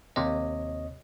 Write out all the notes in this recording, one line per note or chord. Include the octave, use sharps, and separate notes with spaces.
D#2 C3 C#5 D#5